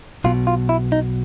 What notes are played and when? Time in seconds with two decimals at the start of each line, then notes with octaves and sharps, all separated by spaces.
0.24 B1 B2 F4
0.47 F4
0.69 E4
0.92 D#4